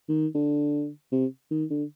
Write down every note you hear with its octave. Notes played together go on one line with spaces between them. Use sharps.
D#3
D3
C3
D#3
D3